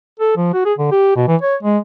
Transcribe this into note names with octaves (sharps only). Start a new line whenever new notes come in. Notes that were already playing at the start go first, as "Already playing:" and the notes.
A4
F3
F#4
G#4
D3
G4
B2
E3
C#5
G#3